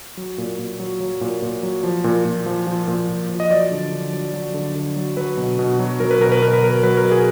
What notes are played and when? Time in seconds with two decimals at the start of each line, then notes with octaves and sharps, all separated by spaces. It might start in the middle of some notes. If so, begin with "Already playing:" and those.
0.17 F#3
0.38 A#2
0.59 A#2
0.80 F#3
1.01 F#3
1.21 A#2
1.42 A#2
1.63 F#3
1.83 F3
2.04 A#2
2.25 A#2
2.46 F3
2.67 F3
2.88 A#2
3.09 A#2
3.29 F3
3.40 D#5
3.51 F#3 D5
3.71 D3
3.92 D3
4.13 F#3
4.34 F#3
4.54 D3
4.75 D3
4.96 F#3
5.17 F#3 B4
5.37 B2
5.59 B2
5.79 F#3
6.00 F#3 A#4
6.11 B4
6.21 B2 A#4
6.32 B4
6.42 B2 A#4
6.53 B4
6.62 F#3 A#4
6.83 F#3 B4
6.97 A#4
7.05 B2
7.11 G#4